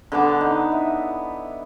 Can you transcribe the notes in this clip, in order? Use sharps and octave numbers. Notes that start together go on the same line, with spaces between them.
D3 B3 A5 D6
D#4
E4